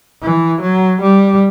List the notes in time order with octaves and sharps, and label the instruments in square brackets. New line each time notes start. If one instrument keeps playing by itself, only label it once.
[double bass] E3
F#3
G3